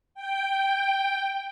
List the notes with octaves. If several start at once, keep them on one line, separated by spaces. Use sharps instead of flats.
G5